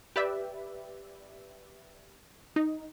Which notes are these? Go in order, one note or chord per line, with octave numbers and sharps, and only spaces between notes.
G4 B4 D5 E5
D#4